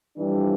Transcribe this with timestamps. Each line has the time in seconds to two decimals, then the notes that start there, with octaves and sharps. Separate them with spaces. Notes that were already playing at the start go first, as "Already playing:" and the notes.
0.17 F2 E3 G3 D4